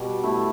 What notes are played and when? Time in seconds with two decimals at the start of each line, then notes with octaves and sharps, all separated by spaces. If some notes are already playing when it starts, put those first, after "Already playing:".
Already playing: B2 G3
0.23 A3 E4